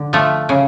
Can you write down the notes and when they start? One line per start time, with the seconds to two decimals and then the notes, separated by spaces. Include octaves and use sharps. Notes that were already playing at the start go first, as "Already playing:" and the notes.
Already playing: D3
0.13 F3 A3
0.49 C#3